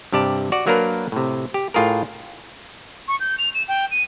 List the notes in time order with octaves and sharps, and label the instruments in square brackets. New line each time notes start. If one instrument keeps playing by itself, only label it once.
[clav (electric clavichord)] G2 C3 G4 D5 A5
F#4 D5
F#3 A#3 D4 A#4 B4
A2 C3
G4
A2 F4 G#4 A#4
[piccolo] C#6
G6
F7
E7
G5
D#7